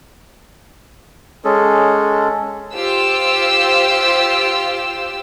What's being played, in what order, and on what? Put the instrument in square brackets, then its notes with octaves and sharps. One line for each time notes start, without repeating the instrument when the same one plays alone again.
[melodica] G#3 C#4 G#4 A4
[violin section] F4 G4 C5 E6